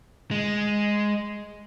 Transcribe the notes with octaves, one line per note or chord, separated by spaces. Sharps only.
G#3